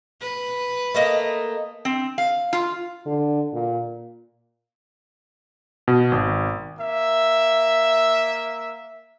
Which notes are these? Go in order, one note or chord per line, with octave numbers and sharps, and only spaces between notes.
B4
A3 A#3 D#5
C4
F5
F4
D3
A#2
B2
G#1
A#3 E5